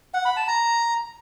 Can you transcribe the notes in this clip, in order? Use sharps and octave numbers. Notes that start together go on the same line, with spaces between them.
F#5
B5
A5
A#5